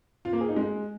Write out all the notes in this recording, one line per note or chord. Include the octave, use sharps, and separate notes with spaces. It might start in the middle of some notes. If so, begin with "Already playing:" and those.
F4
A#3
G#4
D#4
G#3